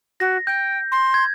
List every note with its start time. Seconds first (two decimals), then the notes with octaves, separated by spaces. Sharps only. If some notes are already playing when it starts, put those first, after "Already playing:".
0.20 F#4 A#6
0.47 G5 G6
0.92 C6
1.14 G#6